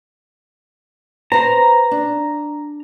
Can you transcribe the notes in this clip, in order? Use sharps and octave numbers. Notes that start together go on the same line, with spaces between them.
B4 C5 A#5
D4